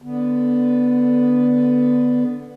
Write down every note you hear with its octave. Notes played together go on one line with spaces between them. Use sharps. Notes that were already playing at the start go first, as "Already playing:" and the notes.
D3 B3